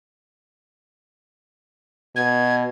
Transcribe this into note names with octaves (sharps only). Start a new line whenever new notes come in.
B2 G#6